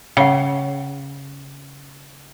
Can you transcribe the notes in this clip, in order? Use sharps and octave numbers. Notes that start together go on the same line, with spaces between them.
C#3 F#5 G5